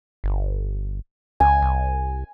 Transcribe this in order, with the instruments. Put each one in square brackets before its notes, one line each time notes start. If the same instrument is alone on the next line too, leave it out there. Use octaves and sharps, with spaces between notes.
[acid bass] G1
[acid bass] C#2 [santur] G#5
[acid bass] C2